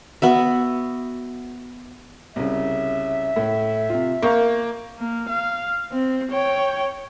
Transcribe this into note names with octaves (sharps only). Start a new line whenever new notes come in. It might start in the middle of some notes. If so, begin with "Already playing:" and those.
B3 F#4 E5
C2 C#3 E5
A2
C3 F4
A#3 F5 C#6 G6
A#3
F5
C4
C#5 G5